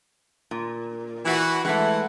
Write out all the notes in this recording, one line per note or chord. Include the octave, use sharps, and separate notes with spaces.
A#2
E3 F#4
E3 G#3 A3 F#5